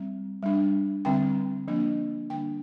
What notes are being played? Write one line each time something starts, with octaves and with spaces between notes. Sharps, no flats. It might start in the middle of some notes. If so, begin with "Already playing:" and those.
Already playing: G3 C4
G3 D4
D3 G3 C4 G5
F3 A#3 D4
D3 G3 A#3 D4 G5